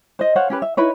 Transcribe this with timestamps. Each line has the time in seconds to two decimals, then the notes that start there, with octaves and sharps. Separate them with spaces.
0.19 C5 D#5
0.36 C5 C#5 F5 F#5
0.50 C#4 G4 B4
0.62 E5
0.77 D#4 E4 B4 C#5